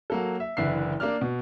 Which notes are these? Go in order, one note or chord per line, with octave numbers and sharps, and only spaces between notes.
F#3 A#3 A4
E5
F#1 D3 E3 D4 E5 C7
A#3 D4 D5 F6
B2